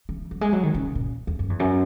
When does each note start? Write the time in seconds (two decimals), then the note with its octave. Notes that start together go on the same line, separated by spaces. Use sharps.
0.09 E3
0.31 F#3
0.41 G#3
0.52 F#3
0.63 D#3
0.74 C#3
0.95 A#2
1.27 E2
1.39 F#2
1.50 E2
1.60 F#2